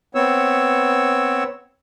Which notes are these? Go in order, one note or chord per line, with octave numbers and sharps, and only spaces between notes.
B3 C4 C#5 E6